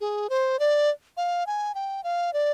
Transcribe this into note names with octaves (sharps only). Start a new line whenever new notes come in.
G#4
C5
D5
F5
G#5
G5
F5
D5